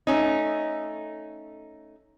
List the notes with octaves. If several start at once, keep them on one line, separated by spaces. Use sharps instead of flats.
A3 C#4 D#4